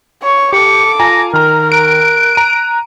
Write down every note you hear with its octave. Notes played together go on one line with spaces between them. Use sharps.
C#5 C#6
G4 A4 D6 C#7
F4 G#5 A#5 A#6
D#3 A#4 A#5 F6
F#6 D7
A#5 D#7